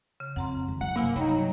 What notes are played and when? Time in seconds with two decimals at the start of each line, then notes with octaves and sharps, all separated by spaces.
0.20 C#3
0.36 F2 F#5 A#5 C6
0.68 D#3
0.81 F#3 E4 F#5
0.96 G2 C3 A#3 G#5
1.16 G2 F#3 D#4 G5 B5